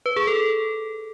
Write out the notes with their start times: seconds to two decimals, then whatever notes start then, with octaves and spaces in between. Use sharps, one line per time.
0.06 B4
0.16 G#4
0.27 A4